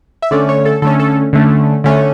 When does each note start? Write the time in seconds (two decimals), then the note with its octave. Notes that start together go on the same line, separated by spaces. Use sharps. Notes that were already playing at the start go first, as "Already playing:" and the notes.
0.22 E5
0.31 D3 A3 C#4 D5
0.49 C#5
0.65 A4
0.82 D3 A3 C#4 A4
0.99 A4
1.33 D3 A3 C#4
1.84 D3 A3 C#4